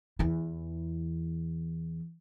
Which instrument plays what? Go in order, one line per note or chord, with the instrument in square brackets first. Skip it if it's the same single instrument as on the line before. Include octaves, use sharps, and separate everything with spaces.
[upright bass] E2 E3